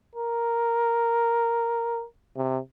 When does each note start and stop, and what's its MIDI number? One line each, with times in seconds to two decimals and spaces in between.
0.15 2.05 70
2.36 2.58 48